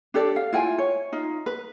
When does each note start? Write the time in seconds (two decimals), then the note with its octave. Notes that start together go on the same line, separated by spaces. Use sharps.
0.14 D4 G4 A4 D5
0.36 F5
0.53 E4 F4 G5 G#5
0.78 C#5
1.12 D#4 F4
1.46 B4